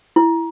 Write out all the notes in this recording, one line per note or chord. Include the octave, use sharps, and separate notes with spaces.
E4